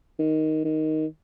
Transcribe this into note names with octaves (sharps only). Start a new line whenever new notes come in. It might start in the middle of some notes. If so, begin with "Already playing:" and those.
D#3
D#3